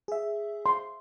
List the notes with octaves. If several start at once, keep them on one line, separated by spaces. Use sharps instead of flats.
G#4 E5
C6